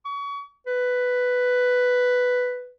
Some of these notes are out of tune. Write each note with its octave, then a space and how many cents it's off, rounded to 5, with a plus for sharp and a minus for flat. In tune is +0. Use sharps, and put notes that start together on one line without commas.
C#6 +30
B4 +5